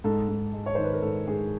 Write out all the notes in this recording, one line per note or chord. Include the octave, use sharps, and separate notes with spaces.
G#2 A4
G#2
G#3
C#5
D#3 C5
B4
A#4
G#2 A4
G#2 G#4